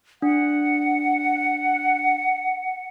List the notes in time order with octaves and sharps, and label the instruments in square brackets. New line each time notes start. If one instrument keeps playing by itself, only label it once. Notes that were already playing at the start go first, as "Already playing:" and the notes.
[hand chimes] D4 [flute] F#5